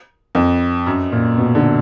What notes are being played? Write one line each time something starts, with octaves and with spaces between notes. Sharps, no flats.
F2
F#2
A#2
B2
D3